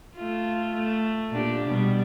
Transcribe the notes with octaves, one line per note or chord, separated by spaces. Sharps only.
A3 F4
A3
A#2 D4 G4
B2 G3